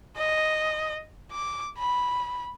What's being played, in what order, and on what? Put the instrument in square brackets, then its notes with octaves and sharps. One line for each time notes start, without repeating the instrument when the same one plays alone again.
[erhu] D#5
D6
B5